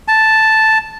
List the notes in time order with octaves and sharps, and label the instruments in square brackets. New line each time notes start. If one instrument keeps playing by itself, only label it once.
[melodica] A5